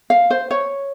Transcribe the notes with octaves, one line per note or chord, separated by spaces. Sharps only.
F5
C5
C#5